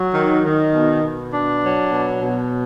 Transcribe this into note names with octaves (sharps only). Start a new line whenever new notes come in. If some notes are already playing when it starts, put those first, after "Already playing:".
Already playing: F#3
D#3
D#3
B2
B2
D4
F#3
B2
B2